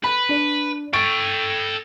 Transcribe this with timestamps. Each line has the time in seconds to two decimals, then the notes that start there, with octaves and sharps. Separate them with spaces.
0.04 B4 B5
0.29 D4
0.93 A4 G5 C#6 A6 D7